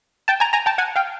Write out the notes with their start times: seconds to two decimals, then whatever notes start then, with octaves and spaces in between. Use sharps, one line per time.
0.28 G5 A5
0.40 G#5 A#5
0.53 G#5 A#5
0.66 G5 A5
0.78 F#5 G#5
0.96 F5 G5